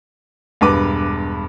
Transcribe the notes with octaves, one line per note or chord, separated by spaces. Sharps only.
E1 G2 B4 D6